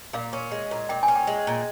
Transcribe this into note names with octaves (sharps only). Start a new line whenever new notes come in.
A#2 F5
C#4
G#3
A#2
A#2 G5
G#5
C#4
G5
G#3
A#2